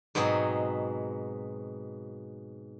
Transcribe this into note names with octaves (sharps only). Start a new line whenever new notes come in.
G#2 B2 F#3 C4 G#4